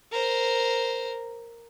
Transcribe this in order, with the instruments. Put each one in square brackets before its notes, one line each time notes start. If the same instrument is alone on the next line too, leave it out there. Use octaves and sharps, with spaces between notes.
[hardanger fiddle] A#4 C5